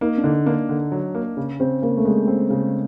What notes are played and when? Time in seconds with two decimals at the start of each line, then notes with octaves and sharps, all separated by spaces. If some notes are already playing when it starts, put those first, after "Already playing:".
0.01 A#3 D#4
0.18 D4
0.24 D3 D#4
0.46 A#3 D4
0.69 D3
0.92 F#3
1.15 A#3
1.37 C#3
1.60 C#3 C4
1.82 C#3 A#3
1.97 A3
2.05 C#3 G#3
2.28 C4
2.50 C#3